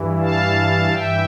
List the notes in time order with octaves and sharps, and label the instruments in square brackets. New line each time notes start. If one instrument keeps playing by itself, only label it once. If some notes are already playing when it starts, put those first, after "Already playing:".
Already playing: [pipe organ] G2 E3
F5 A5
G2 E3 E5 G5